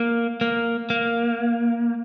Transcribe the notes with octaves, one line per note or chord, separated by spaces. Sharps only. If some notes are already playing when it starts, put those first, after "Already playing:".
Already playing: A#3
A#3
A#3